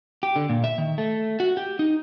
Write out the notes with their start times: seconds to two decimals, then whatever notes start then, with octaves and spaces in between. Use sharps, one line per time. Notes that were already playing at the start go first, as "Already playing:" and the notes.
0.23 G4
0.36 D3
0.49 A#2
0.64 E5
0.78 D#3
0.98 A3
1.40 F#4
1.57 G4
1.79 D#4